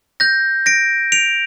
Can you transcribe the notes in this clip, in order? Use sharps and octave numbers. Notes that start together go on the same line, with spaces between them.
G6 A#6
A#6 D7
D7 F7